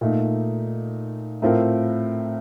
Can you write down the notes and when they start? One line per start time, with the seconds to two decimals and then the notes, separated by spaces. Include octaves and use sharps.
0.01 A#2 A3 D#4
1.42 A2 A3 C4 F4 A#4